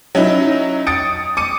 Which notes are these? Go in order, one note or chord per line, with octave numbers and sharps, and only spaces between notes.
F#3 C#4 D#4 E4
D#6 A6 C#7 D7
D6 C#7 D#7